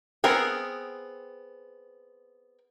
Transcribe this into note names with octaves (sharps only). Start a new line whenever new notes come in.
B3 C4 G#4 A#4 F#5